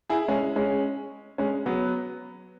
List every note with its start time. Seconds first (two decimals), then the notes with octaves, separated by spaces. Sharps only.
0.10 E4 G#4
0.28 G#3 C#4
0.56 G#3 C#4
1.38 G#3 C#4
1.66 F#3 B3